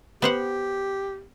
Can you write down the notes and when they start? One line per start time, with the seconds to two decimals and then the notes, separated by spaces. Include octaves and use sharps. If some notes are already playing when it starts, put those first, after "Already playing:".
0.22 B3 G4 C5 F#5